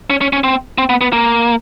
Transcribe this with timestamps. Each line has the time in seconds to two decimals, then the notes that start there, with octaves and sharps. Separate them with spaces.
0.10 C#4
0.21 C#4
0.33 C#4
0.44 C4
0.78 C4
0.89 B3
1.01 B3
1.13 A#3